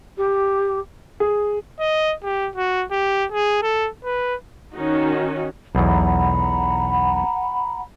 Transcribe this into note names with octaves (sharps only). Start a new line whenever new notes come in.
G4
G#4
D#5
G4
F#4
G4
G#4
A4
B4
D#3 C#4 D#4 F#4
B1 E2 F#5 A#5 B5